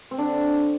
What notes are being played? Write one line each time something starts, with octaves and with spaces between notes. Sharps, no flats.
C4
D3 D4